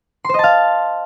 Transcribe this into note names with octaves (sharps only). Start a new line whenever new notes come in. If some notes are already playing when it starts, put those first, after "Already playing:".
C5 D#5 F5 A5 C6